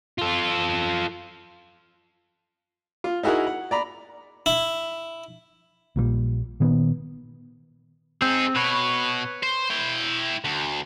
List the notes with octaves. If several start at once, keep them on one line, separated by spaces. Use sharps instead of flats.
F4 A4
F4
D#4 E4 F#4 G#4 A#4
F#5
D5 A#5 B5
E4
A#1 A#2 E3 G3
A#2 D#3 B3
C4 D#4 G#4
B2 B4 C#5
C5
E4 G5
D2